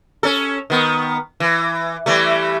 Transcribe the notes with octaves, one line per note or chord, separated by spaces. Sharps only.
C#4 A4
D#3 B3
E3
E3 G3 A3